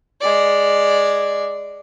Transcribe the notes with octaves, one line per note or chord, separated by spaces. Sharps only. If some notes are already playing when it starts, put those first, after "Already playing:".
G#3 D5